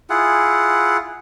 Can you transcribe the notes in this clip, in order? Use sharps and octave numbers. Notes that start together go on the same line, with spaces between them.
E4 F4 G#4 F#5